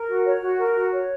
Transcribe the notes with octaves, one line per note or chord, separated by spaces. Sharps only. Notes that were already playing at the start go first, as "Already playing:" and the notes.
Already playing: A#4
F#4
C#5
F#4
A#4
F#4
C#5